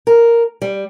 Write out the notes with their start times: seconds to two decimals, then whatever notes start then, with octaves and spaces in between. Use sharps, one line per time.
0.07 A#4
0.62 G3